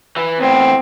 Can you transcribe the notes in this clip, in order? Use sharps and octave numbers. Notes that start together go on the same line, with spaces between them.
E3
E2 A2 C4